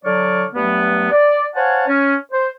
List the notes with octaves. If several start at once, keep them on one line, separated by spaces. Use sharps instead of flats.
D3 F#3 C#5 D5 C#6 F6
G2 F#3 A3 B3
D5
C5 C#5 F5 F#5 G#5 A5
C#4
C5